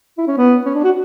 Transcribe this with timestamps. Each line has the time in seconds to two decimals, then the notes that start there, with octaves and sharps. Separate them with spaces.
0.18 E4
0.27 C#4
0.37 B3
0.65 C#4
0.74 D4
0.84 F#4